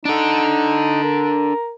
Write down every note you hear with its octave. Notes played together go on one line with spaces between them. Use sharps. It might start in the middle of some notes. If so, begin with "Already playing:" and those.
D4 D#4 A4
A#4